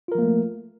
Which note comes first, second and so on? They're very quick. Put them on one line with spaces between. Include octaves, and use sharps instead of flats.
F4 A#4 F3 A#3 A3